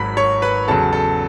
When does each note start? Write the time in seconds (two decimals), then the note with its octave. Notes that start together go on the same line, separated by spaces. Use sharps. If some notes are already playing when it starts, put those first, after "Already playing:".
Already playing: G#1 G#2 F#3 B5 B6
0.17 C#5 C#6
0.42 B4 B5
0.68 E2 C#3 F#3 A4 A5
0.93 A4 A5